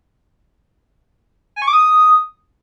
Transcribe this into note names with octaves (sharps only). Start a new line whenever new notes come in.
G#5
C#6
D6
D#6